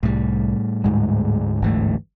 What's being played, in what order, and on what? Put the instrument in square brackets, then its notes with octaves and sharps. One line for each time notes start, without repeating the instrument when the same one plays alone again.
[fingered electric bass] C2 [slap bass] A2 G3
[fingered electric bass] D2 G#2 G#3
[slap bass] G1 E3 A3